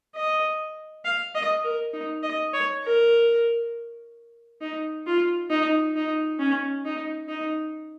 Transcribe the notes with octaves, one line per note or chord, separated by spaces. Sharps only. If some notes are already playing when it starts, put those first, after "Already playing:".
D#5
F5
D#5
A#4
D#4
D#5
C#5
A#4
D#4
F4
D#4
D#4
C#4
D#4
D#4